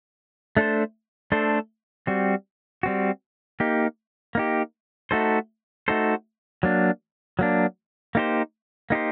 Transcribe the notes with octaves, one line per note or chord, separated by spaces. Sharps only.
A3 D4 A4 C5
A3 D4 A4 C5
G3 C4 F#4
G3 C4 F#4
A#3 D#4 G4
A#3 D#4 G4
A3 D#4 F#4 A4 C5
A3 D#4 F#4 A4 C5
F#3 A#3 D4
F#3 A#3 D4
A#3 D#4 G4 C5
A#3 D#4 G4 C5